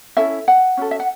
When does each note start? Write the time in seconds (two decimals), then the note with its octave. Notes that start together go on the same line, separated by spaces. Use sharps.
0.17 C#4 E4 A4 E5
0.48 F#5
0.77 C#4 F#4 A4
0.91 E5
1.00 F#5